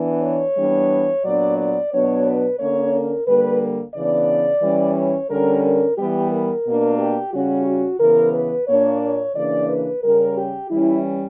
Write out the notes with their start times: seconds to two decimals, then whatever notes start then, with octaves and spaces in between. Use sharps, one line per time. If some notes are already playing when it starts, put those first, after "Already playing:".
Already playing: E3 B3 D4
0.23 C#5
0.57 E3 G3 B3 D4
1.25 A#2 F#3 B3 D4 D5
1.59 D5
1.92 B2 F#3 B3 D4 C#5
2.26 B4
2.60 D3 A#3 C#4 C#5
2.94 A#4
3.27 D3 G3 A#3 B4
3.95 C#3 E3 B3 D4 D5
4.63 E3 G3 C#4
4.97 C#5
5.30 D3 G3 C#4 A#4
5.64 A#4
5.98 E3 G3 B3 G4
6.32 A#4
6.66 B2 A#3 D4
6.99 G4
7.33 C#3 G3 C#4 F#4
7.67 F#4
8.00 C#3 E3 B3 A#4
8.34 B4
8.68 A#2 A#3 D4 C#5
9.02 C#5
9.36 C#3 E3 A#3 D4 D5
9.69 B4
10.04 C#3 G3 C#4 A#4
10.37 G4
10.71 E3 G3 C#4 E4